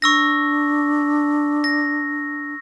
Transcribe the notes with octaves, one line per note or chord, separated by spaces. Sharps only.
D4 C#6 E6 A#6
A#6